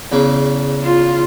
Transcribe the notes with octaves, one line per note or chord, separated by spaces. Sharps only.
E2 C#3
F4